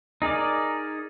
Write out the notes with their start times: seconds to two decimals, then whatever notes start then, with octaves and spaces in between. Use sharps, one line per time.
0.22 D#4 G#4 A#4 D5